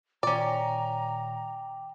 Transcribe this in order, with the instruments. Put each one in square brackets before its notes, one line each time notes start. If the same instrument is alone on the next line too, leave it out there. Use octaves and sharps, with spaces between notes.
[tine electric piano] A#2 D#3 [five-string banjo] C#4 D5 [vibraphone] G5 D6 [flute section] A#5